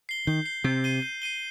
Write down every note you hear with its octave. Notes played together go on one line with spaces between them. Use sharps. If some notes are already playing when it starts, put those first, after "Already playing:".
C7 G7
D#3 G6
C7 G7
C3 G6
C7 D#7 G7
G6
C7 D#7 G7